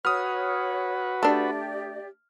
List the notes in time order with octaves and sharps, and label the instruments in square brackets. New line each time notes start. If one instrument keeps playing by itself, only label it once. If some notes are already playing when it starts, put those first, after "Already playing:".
[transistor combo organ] F#4 B4 [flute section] C#5 [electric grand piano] D#6 F6
[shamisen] A3 D4 [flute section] G4 D5